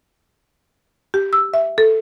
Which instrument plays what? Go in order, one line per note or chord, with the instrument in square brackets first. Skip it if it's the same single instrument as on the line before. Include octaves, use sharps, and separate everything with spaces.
[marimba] G4
E6
E5
A4